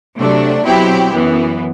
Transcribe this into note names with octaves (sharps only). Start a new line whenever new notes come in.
C3 F#3 A3 D4
B2 F#3 C4 E4 G4
F#2 E3 B3